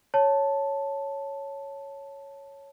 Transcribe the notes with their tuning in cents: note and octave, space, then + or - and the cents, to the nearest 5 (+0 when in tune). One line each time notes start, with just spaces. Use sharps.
C#5 +0 A5 +0